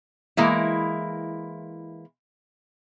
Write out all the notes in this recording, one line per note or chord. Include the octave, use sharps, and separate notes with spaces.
E3 G#3 A#3 E4